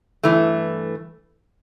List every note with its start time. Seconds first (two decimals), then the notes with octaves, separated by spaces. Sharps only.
0.23 G2 E3 A3